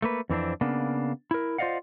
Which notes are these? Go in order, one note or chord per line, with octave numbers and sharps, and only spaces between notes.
A3 A#3 B4
F2 E3 C4 D4
C#3 A#3 B3 D4
E4 A#4
F4 C5 D5 D#5 F5 F#5